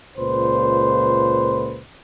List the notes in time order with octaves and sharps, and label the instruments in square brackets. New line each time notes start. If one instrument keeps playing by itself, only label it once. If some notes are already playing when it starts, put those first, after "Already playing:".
[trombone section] C#2 A#2 B4 C5